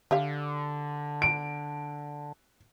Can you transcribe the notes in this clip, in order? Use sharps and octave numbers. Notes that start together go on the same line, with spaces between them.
D3 G4 E5 F5
D7